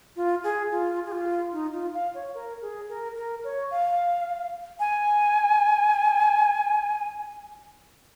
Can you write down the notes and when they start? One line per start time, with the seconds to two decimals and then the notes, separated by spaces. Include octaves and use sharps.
0.16 F4
0.44 G#4
0.71 F4
1.06 G#4
1.12 F4
1.53 D#4
1.73 F4
1.94 F5
2.14 C#5
2.35 A#4
2.62 G#4
2.89 A#4
3.16 A#4
3.44 C#5
3.71 F5
4.80 G#5